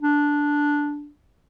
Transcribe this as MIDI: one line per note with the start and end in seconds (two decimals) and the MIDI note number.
0.02 1.11 62